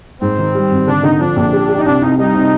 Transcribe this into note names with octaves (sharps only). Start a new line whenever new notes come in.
G#2 C4
D#3
G3
G#1
D3 D4
D3 D#4
F3 D4
A#1
G4
G4
D#4
C2 D4
C2 D#4
G3 D#4
C3